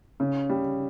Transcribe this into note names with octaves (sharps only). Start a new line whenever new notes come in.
C#3
G3